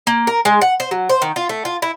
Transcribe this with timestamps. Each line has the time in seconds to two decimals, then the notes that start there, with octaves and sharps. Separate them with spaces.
0.07 A#3
0.27 A#4
0.45 G#3
0.61 F#5
0.80 C5
0.91 F#3
1.09 C5
1.22 D#3
1.36 F4
1.49 A3
1.65 F4
1.82 E4